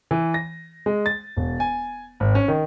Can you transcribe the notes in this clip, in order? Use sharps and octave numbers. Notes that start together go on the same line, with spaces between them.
E3
A#6
G#3
A6
E1
G#5
G#1
C#4
D#3